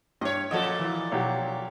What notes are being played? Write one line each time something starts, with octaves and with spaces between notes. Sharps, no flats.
G2 C#5 D#5
A#2 F3 C#4 F#4 A4 D#5
E3
B1 F#3 G4